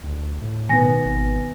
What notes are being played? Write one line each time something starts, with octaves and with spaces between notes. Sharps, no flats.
D2
A2
B2 D#3 B3 G#5 A#6
G#1